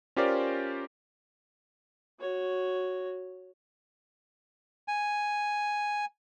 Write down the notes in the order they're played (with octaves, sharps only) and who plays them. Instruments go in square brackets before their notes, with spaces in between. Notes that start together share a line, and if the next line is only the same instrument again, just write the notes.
[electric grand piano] C#4 F4 G4 A#4 C5 D5
[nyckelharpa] F#4 C#5
[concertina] G#5